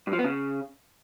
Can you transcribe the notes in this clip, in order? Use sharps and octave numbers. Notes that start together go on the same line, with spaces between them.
G2
F3
B3
C#3